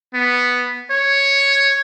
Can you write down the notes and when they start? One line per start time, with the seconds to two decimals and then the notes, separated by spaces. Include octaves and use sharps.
0.14 B3
0.90 C#5